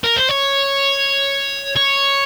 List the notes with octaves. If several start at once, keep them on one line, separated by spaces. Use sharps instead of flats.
A#4
C5
C#5
C#5